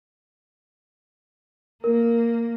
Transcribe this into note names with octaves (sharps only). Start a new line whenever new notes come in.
A#3 A#4